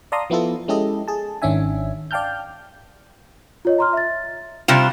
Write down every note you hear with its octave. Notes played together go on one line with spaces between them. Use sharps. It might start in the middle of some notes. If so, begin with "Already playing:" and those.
D5 F5 A5 A#5 C6 D#6
F3 B3 E4 F4 A4
G#3 C#4 E4 G4 A4 D#5
G#4 A5
G#1 D#3 C#4 D4 E5 G#5
D5 F5 G5 A5 F6 G6
F4 C#5 D#5
A#5 C6 F6
E5 A6
C3 G3 F4 E7